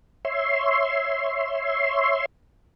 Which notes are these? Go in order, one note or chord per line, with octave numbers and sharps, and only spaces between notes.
C#5 E5 C6